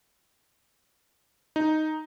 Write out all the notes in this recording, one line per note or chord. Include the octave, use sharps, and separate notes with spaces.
D#4